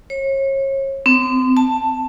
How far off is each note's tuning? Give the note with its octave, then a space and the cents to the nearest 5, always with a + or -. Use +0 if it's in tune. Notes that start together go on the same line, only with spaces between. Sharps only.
C#5 -35
C4 -30
A5 +5